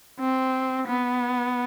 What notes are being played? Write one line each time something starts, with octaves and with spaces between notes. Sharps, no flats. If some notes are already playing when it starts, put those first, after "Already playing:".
C4
B3